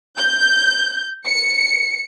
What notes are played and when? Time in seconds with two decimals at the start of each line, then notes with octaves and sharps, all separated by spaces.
0.18 G6
1.27 C#7